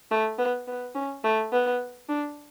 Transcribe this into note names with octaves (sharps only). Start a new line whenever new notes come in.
A3
B3
B3
C#4
A3
B3
D4